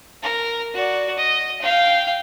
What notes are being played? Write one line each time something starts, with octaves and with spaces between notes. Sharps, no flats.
A#4
F#4 D5
D#5
F5 G5